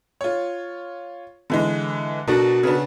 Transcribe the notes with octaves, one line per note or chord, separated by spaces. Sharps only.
F4 C#5
D3 E3 G#3
B2 D4 F#4 A4 A#4
C#3 B3 D4